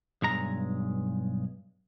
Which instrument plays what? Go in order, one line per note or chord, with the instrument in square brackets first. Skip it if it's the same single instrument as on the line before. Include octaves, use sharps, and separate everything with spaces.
[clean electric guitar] B1 G2 G#3 A#5